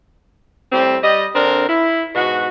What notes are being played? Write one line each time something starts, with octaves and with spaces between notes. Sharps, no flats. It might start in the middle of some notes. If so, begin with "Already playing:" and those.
A2 G3 C4
G3 D#5
D3 C4 D4 A#4
E4
G#2 B2 F#4